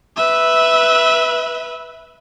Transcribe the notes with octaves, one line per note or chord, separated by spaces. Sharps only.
B4 E5